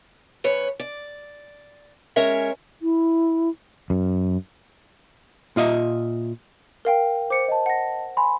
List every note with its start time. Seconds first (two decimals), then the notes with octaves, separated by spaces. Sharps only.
0.44 F#2 B4 C#5
0.80 D5
2.16 G#3 C#4 A#4 C#5 E5
2.82 E4
3.90 F#2
5.56 A#2 F4 D#5 E5
6.85 A#4 F5 G5
7.30 C5 D6 C#7
7.48 D#5 A5
7.66 F#5 A#6
8.17 G#5 B5 C6